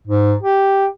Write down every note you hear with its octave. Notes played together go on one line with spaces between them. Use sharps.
G#2
G4